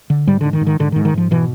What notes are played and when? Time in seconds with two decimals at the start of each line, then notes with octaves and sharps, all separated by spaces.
0.10 D3
0.27 G#2 G3
0.41 G#2 D3
0.53 D#3
0.61 G#2
0.67 D#3
0.79 G#2 D3
0.92 D#3
0.96 G#2
1.05 D#3
1.14 G#2 F3
1.31 B2 E3